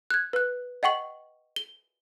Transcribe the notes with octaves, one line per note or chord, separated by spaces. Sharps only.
F#6 G#6
B4 F#6
D#5 F#5 G5 C#6 F#7
G7